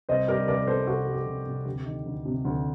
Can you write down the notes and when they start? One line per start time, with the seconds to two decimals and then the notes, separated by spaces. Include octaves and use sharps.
0.09 C2 C5 D#5
0.28 G3 A#4 D5
0.48 C2 A#4 D5
0.67 C3 A4 C5
0.87 C2 F#4 A4
1.07 G3
1.14 G4
1.27 C2
1.46 C3
1.65 D2 G4
1.85 D#3
2.06 D2
2.25 C3
2.45 D2